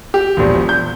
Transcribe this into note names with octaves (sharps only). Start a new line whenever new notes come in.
G4
E1 A#1
G6